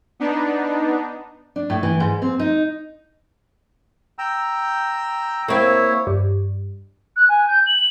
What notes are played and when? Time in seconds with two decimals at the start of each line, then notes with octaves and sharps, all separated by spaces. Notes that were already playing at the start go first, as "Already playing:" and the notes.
0.20 B3 D4 D#4
1.56 D4
1.70 A2
1.83 E3
2.00 G#2
2.22 C4
2.39 D#4
4.19 G5 A#5 E6
5.48 A#3 C4 E4 C#5
6.07 G2
7.16 F#6
7.29 G#5
7.48 G6
7.66 F#7